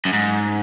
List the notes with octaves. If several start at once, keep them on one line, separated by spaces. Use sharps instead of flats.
F#2
G#2